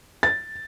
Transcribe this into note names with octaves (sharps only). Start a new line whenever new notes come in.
A6